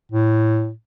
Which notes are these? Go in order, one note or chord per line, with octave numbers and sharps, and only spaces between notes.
A2